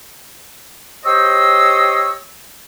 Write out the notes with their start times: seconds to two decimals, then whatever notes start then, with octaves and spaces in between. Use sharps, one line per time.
1.05 G4 C5 C#5 D#5 E6